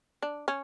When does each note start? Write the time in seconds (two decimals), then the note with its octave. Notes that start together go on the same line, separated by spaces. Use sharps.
0.22 D4
0.48 C#4